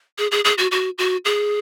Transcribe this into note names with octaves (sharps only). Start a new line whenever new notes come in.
G#4
G#4
G#4
F#4
F#4
F#4
G#4